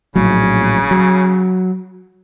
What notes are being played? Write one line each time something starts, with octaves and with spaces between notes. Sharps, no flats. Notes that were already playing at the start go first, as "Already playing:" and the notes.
A#1 A2 C#3 F#3
F#3